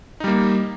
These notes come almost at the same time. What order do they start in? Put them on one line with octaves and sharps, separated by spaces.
D#4 G3 A#3